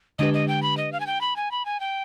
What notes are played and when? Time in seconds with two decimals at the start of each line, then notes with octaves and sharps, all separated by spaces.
0.19 D3 G#3 D4 G4 B4 D#5
0.34 D#5
0.48 G5
0.62 B5
0.77 D#5
0.92 F5
1.00 G#5
1.07 G5
1.21 B5
1.36 G#5
1.51 B5
1.65 G#5
1.80 G5